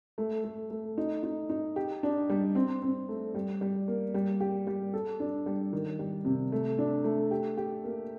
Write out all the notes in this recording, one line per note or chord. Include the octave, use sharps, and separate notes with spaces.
A3
A3
A3
D#4
D#4
D#4
G4
D4
G3
C4
C4
A3
G3
G3
A#3
G3
G4
G3
A4
D4
G3
D#3
G3
C3
A3
D4
A3
G4
G4
A#3